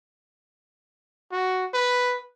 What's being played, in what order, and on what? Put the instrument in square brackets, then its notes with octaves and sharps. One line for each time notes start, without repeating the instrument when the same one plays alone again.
[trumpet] F#4
B4